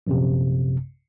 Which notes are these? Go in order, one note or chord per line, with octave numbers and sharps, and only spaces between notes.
A#1 F#2 C3